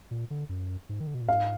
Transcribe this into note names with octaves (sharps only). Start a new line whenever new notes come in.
A#2
D3
F#2
G#2
D#3
D3
B2
A#2
G#2 F5